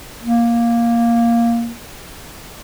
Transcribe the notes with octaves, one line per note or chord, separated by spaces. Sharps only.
A#3